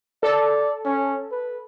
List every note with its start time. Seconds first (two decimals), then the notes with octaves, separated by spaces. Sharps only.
0.23 A4 D5
0.85 C#4
1.32 B4